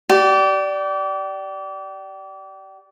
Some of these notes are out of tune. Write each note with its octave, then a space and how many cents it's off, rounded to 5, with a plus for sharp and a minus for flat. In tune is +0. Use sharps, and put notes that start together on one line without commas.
G4 -35 D5 +0